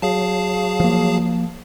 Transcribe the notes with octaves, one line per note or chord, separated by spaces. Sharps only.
F#3 G#4 F5 A5
F3 A#3